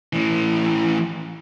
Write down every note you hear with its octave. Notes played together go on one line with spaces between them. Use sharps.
A2 E3